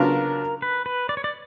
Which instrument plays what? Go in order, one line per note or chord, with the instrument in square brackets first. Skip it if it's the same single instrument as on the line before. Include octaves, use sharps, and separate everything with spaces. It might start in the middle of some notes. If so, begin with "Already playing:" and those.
Already playing: [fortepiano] C#3 F#3 B3 D4 F4 [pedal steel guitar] A#4
[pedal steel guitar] B4
B4
D5
C#5
D5